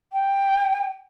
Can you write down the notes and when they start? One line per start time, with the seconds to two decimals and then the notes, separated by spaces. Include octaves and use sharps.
0.12 G5